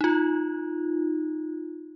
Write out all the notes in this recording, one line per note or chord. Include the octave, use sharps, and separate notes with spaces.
D#4 F4